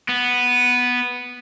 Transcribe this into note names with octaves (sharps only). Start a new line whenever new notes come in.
B3